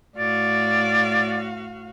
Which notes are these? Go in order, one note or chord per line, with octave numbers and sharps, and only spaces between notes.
A2 F#4 D5 F5